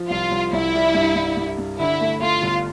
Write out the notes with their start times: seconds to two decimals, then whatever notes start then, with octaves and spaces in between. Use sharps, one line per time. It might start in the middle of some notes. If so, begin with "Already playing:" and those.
Already playing: F3
0.10 C2 F4
0.31 C2
0.53 C2 E4
0.74 G3
0.95 G2
1.16 G2
1.37 G2
1.58 G2
1.79 D3 E4
2.01 A3
2.22 A3 F4
2.43 G1